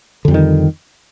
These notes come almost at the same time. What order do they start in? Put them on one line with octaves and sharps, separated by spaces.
D3 F2 G3 D#3